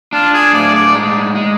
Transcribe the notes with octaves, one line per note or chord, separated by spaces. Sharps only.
D4 F4
G#4
A2 D5
D5
G#3
G#3